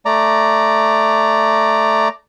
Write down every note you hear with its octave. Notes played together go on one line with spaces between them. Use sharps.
A3 D5 A#5